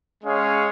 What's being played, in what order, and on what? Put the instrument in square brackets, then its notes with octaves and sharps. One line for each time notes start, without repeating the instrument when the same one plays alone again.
[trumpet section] G#3 C#4 G#4 C#5 F5